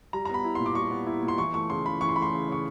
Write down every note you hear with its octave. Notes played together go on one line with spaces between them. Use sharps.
G3 A#5
A#5
B3
B5
E4
A#2 C6
D6
G3 C#6
B3
E4
A#2
C6
E3 C#6
A3 C#6
C#3 C6
C#3 B5
E3 C#6
C6
A3 B5
C6
C#3
C#3 C#6